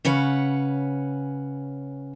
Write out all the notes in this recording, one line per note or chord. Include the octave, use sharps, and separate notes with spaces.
C#3 C#4 B4 F#5